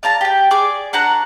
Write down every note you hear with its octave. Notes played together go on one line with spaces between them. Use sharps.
D5 F5 A5 A#5
G4 G5
G#4 D5 D6
D4 F#4 F#5 A#5